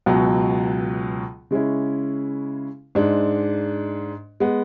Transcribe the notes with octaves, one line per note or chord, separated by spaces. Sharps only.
C#2 B2 F#3
C#3 G#3 C#4 E4
G#2 G#3 D4
G#3 B3